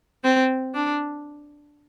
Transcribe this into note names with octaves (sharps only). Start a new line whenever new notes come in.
C4
D4